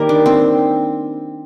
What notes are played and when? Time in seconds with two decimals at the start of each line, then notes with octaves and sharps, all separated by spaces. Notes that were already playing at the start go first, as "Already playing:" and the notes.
Already playing: D#3 G3 A#3 G4 A#4
0.09 D4
0.26 C4